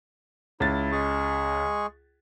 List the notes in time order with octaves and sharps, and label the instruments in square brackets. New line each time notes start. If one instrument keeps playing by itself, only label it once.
[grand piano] C#2 A6 [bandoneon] E4
[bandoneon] G#3 G#4 C#6